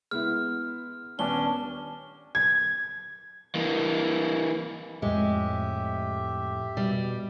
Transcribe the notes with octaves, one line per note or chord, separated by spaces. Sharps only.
G#3 B3 E4 F6
D#1 B3 C#4 D4 C#5 G7
G#6
E3 A#3
F2 A2 G#3 G4 E5
B2 G3